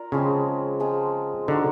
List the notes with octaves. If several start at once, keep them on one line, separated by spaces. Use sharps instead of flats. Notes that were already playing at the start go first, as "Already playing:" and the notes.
Already playing: F4 A#4 D5
C#3 F3 G#3 C4
F3 G#3 C4 F4
D3 D#4 F#4 A#4